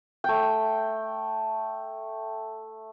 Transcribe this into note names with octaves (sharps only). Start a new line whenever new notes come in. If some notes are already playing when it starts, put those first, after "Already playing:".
A3 G5